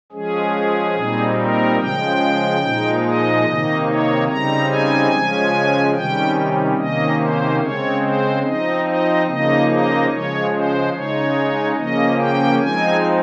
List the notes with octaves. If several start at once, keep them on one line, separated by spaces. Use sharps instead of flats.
F3 G#3 C#4 G#4
A#2 G3 C4 D#4
A#4
C#3 F3 G#3 G5
A#2 F3 G#3 D#4
D#5
C3 D#3 A#3 D#4
C#5
C#3 G3 C4 D#4 A#5
G#5
C#3 F3 G#3 C#4
C3 D#3 G3 C#4 G5
C3 D#3 A#3 C#4 D#5
C5
C#3 G#3 C4 C#5
C5
F3 C4 D#4 D#5
D#5
C#3 F3 A#3 D#4 D#5
D#5
C#3 F3 G#3 C#5
C5
C#3 G#3 D#4 C#5
C#3 F3 A#3 C#4 D#5
G5
F3 G#3 C4 D#4 G#5